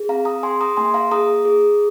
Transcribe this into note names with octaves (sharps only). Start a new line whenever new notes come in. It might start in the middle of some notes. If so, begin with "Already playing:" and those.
Already playing: G#4
C4 F5 A#5
A#5 D#6
G#4 G#5 C6
A#5 D#6
A#3 G#5 C6
F5 A#5
G#4 A#5 D#6
G#4